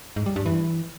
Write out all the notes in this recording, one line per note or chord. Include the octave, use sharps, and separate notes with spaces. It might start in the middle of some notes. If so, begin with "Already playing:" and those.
G#2
G3
G2
E3